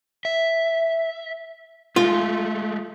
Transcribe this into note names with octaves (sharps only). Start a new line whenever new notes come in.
E5
G#3 A3 F4